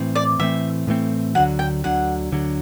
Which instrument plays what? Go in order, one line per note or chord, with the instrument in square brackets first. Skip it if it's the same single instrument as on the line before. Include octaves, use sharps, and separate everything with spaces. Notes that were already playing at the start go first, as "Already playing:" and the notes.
Already playing: [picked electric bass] A2 E3 A3 C4
[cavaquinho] D5
[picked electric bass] A2 E3 A3 C4 [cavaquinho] E5
[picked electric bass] A2 E3 A3 C4
[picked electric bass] D2 D3 F#3 [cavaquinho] F#5
[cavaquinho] G5
[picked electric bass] D2 D3 F#3 [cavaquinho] F#5
[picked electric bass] D2 D3 F#3